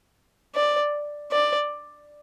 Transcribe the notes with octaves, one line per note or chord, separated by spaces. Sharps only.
D5
D5